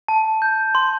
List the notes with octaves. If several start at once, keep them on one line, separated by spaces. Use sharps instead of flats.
A5
G6
C6